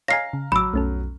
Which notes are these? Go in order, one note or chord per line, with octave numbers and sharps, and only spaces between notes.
C#5 D#5 F5 G#5 A#5 F6 A#6 C7
C#3
A1 F#3 B5 D6 E6
B1 F2 A3 C#4 A4